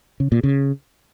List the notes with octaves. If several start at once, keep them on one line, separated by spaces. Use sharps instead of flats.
C#3
A#2
C#3